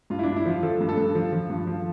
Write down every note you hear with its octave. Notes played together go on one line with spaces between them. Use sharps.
G2 F4
E4
G2 D4
E4
F3 F4
F3 A4
G2
A4
G2
F3
F3
G2
F3